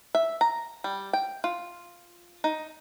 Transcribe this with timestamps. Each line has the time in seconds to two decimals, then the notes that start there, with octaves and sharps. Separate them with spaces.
0.15 E5
0.41 A#5
0.84 G3
1.13 G5
1.44 F4
2.44 D#4